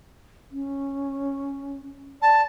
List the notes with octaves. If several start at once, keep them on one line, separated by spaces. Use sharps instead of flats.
C#4
D5 A5